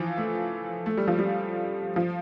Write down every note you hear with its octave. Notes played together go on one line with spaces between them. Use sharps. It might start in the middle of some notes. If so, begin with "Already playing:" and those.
Already playing: E3 F3
A3
A3
G3
F3
G3
F3